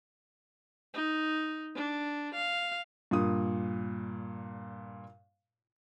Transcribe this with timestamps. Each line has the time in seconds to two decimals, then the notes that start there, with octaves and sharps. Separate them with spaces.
0.94 D#4
1.75 D4
2.34 F5
3.11 G2 A#2 D#6